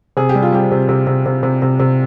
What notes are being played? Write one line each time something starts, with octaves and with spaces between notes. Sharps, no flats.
C3 G#4
G4
G3
F4
G3 G4
C3
C3
C3
C3
C3
C3
C3